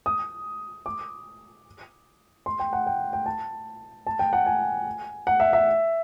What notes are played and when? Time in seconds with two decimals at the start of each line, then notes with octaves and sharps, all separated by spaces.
0.06 D#6
0.86 D6
2.46 C6
2.60 G5
2.73 F#5
2.87 G5
3.13 G5
3.26 A5
4.07 A5
4.19 G5
4.33 F#5
4.46 G#5
5.27 F#5
5.40 E5
5.53 E5